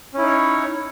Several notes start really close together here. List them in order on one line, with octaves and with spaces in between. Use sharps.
C#4 E4 D#4 C#5